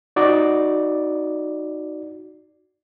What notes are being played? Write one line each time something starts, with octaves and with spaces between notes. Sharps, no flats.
D#4 F#4 D5